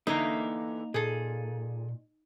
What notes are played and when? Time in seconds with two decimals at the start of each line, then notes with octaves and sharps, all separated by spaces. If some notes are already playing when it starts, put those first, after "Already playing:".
0.07 D3 E3 A3 A#3 D#4 A#5
0.94 A#2 G#4 A4